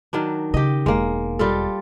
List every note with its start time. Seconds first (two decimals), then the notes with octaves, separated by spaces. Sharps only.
0.13 D#3 F#3 D4
0.54 C#3 G4 D#5
0.86 E1 G#3 A#3
1.39 G3 F4 A4